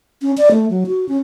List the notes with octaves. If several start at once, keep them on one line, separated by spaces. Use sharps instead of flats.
C#4
D5
A3
F#3
F#4
C#4